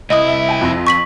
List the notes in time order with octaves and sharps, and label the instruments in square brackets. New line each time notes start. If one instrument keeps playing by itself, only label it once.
[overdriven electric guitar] C2 E4 [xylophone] D#5 D#6
[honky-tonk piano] E5
G5 G#5
F2 C6 A#6
[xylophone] C#6 B6 F#7